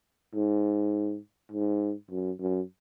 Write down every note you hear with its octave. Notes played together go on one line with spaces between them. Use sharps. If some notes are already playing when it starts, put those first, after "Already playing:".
G#2
G#2
F#2
F#2